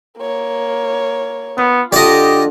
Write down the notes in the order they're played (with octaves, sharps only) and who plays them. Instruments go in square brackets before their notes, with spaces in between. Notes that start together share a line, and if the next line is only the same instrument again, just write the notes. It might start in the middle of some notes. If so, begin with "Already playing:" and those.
[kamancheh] A#3 C#5
[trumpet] B3 [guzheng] F4
[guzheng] D3 A4 [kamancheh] F4 [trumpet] G4 [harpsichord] D5 D#5